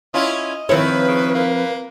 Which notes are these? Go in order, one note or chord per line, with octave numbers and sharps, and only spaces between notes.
C#4 E4 F4 D#5
D#3 F3 C4 E4 B4 C#5
C#3
A#3